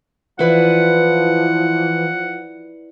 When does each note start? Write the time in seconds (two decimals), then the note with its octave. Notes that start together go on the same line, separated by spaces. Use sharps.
0.39 E3 F3 E4 B4 D5 F#5